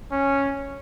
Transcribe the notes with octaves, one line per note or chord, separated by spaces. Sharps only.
C#4